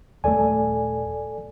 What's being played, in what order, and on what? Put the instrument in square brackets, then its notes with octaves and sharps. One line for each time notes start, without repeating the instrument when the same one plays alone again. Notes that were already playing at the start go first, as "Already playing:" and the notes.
[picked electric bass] D#1 A3 [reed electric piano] A4 D5 G#5